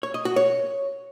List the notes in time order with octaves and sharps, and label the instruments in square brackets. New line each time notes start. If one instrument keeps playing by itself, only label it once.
[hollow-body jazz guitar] C#5
D#5
F#4
C#5